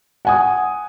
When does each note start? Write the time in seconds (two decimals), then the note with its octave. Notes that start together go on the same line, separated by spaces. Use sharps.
0.25 F#5 G#5 D#6